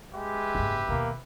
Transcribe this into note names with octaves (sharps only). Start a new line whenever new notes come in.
G#3 G4 B4 E5
F#1 G#2
D#2 B2 A#3